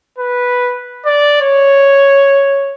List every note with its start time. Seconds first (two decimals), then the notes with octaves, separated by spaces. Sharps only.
0.19 B4
1.05 D5
1.42 C#5